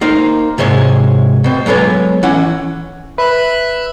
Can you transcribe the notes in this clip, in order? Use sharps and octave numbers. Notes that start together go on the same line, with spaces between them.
A#3 D#4 A#4 C5
G#2 C3 G#3 C#5
B2 C4
F#3 G#3 B3 A4 C#5
E3 C#4 F#5
B4 E5 B5 F#6